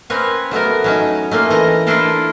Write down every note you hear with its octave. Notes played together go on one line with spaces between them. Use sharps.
A#3 C4 C#4 B4 C#5
F#3 A3 B3 A#4
F#3 C#4 D#4
A3 A#3 C#4 F4
E3 D#5 A#5
D4 E4 F4 A4 A#4 D5